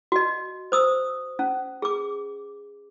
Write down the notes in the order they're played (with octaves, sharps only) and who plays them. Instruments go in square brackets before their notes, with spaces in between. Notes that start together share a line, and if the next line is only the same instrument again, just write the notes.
[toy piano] F#4 D#5
C5 D#6 E6
C#4
G#4 D6